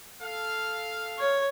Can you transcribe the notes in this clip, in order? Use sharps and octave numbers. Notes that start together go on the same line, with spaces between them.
A4 F5
C#5